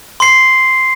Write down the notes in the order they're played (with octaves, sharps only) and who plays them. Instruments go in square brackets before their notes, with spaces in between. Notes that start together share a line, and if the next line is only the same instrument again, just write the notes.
[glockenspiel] C6 C7